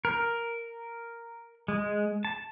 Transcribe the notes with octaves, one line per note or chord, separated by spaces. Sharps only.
A#4
G#3
A5